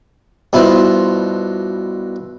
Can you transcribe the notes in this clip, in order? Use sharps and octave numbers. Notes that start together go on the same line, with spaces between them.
G2 B2 E4 F4 C5